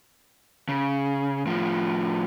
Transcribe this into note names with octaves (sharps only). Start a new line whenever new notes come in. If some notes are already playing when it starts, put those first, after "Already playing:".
C#3
A2 F3